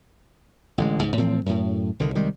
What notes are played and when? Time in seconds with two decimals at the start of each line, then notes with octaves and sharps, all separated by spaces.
0.78 A1 D3 G#3
0.99 C#2 G#2
1.18 A2 E3 F3 C4
1.46 F#2 A2
2.00 C2 D3 D#3
2.15 C2 D#3 G3 G#3